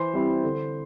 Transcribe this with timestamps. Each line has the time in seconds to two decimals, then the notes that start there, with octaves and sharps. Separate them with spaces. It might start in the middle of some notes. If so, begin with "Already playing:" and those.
Already playing: E3 C5 C6
0.13 G3 C4 E4
0.43 D3